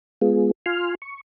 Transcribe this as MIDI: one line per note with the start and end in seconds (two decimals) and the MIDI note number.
0.22 0.51 56
0.22 0.51 59
0.22 0.51 65
0.22 0.51 68
0.66 0.95 65
0.66 0.95 80
0.66 0.95 84
0.66 0.95 89
1.02 1.21 85